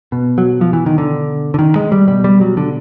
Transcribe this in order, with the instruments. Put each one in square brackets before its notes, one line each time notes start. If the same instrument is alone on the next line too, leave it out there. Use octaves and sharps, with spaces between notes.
[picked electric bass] B2
F#3
F3
E3
D#3
D3
D3
D#3
G#3
G3
B2 G3
G3
F#3
D3